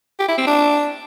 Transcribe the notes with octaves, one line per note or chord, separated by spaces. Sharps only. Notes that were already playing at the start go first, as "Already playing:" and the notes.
G4
E4
C4
D4